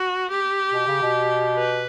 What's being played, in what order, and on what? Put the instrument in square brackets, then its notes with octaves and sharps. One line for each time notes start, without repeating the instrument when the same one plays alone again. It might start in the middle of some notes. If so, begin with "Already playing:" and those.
Already playing: [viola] F#4
G4
[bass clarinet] B2
C#3
B2
[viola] B4